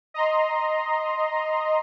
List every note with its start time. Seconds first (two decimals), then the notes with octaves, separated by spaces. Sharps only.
0.14 D#5 A#5 C6